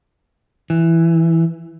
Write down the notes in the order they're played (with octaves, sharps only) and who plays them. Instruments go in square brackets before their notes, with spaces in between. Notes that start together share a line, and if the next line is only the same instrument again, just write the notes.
[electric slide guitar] E3